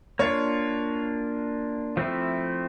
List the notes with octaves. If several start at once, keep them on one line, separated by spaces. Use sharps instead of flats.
A#3 D4 F4 C#5
F3 A3 C4 E4